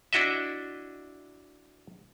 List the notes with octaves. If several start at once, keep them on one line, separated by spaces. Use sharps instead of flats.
D4 E4 F#4 D#5 E5